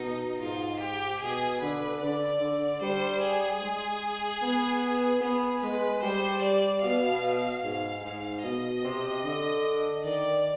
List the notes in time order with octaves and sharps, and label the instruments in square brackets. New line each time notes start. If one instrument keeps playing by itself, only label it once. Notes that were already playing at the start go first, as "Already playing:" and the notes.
Already playing: [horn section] B2 [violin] D#4
[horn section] G#2 [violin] F4
[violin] G4
[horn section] B2 [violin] G#4
[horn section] D3 [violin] B4
[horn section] D3 [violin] D5
[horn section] D3
[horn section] G3 [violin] C5
[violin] G#4
[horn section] G#3
B3
[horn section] B3 [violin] G#4
[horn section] G#3 [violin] B4
[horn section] G3 [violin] C5
[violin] D5
[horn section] B2 [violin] F5
[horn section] G#2 [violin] F5
[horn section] G#2
[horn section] B2 [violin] D#5
[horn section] C3
D3
[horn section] D#3 [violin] D5